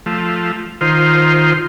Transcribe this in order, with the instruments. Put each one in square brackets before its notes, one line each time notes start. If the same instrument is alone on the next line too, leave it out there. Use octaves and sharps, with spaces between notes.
[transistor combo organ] F3 A3
D#3 F4 C5